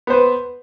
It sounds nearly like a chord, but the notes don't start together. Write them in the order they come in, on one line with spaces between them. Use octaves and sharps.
B3 C5 B4